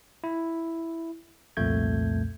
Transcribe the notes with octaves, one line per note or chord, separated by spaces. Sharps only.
E4
C2 F2 A#2 A3 G6 G#6